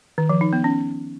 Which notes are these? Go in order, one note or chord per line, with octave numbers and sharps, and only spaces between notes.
D#3
F3
D#4
B3
C#4